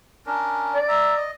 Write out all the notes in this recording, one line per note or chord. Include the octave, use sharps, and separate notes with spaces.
C#4 D4 A#4
D5
E5 A#5
D#5